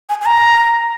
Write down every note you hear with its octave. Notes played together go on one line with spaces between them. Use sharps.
G#5
G#5
A#5